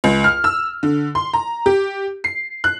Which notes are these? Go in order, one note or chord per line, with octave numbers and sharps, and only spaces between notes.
C#2
F6
E6
D3
C6
A#5
G4
C7
F#6